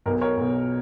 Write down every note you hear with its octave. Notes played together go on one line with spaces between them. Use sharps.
B1 B2 A#4
A#4 C#5
B1 B2